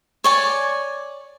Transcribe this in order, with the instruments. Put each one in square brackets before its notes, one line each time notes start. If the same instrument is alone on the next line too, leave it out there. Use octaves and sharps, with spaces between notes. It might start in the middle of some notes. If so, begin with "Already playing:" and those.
[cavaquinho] C#5 D5 G#5